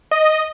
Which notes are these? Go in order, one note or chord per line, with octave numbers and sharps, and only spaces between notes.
D#5